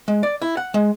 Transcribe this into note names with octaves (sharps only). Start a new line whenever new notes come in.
G#3
D5
E4
F#5
G#3